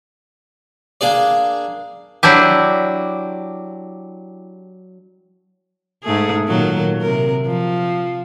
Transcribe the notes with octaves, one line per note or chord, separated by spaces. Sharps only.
A#3 D4 G#4 D5
F#3 D4 E4 G4
G#2 A3 G#4
A#2 D#3 F#3
C3 A#4
F3